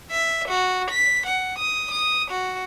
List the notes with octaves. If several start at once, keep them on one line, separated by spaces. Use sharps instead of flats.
E5
F#4
B6
F#5
D#6
D#6
F#4